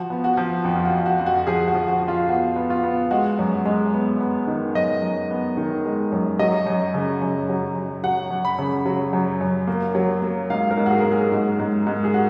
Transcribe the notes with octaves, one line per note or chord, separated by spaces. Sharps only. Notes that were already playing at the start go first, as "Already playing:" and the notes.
Already playing: F3 F#4
B3
F#4
F3
F2
F4
F#4
F2
F#4
F2
F#4
F3 G#4
F#4
F3
F#4
F2
F4
B3 F#4
B3
F4
B3
G#3 F#4
F#2
G#3
B3
B3
D#3
F#2 D#5
F#2
B3
D#3
G#3
F#2
F#3 D#5
F#2
C#3
F#2
F#3
F#2
F#3 F#5
F#2
B5
C#3
F#3
F#2
F#2
A#3
F#3
A#3
G#2 F5
A#4
G#2
F#4
G#4
A#3 A#4
G#4
G#2
G#2
G#2
G#4
F#4